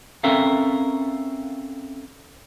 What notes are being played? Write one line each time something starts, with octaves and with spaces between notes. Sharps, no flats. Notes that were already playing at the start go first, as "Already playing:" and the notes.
C4 C#4 A4 A#4 E5 F5